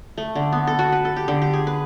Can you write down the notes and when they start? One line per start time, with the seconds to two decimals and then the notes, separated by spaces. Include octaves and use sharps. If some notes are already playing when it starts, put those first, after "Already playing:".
0.18 A3
0.35 D3
0.53 B3
0.67 A4
0.79 F#4
0.92 B4
1.05 A4
1.16 G4
1.28 D3
1.42 G4
1.53 G#4
1.67 B4